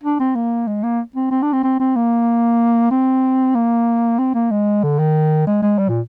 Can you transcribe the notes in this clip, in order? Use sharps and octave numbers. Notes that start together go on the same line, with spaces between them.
D4
C4
A#3
G#3
A#3
C4
C4
D4
C4
C4
C4
A#3
C4
A#3
C4
A#3
G#3
D3
D#3
G#3
G#3
G3
A#2